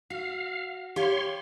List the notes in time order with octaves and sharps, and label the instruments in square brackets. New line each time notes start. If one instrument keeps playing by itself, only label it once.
[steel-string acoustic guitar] F#4 [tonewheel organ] F5
[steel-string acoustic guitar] G4 F5 G#5 [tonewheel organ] C#5 C6